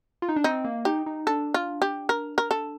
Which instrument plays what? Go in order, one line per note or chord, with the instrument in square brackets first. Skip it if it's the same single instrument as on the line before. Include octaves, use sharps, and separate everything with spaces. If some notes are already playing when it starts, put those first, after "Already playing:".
[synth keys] F4
D#4
D4
[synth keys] C4 [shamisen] D#4
[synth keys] A#3
[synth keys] D#4 [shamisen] G4
[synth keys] D#4
[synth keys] D4 [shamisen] A4
[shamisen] F4
G4
A#4
A#4
A4